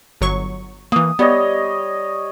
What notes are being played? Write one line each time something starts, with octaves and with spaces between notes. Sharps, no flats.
G1 F#3 C#6
E3 A#3 D#6
G3 B3 C#5 D#5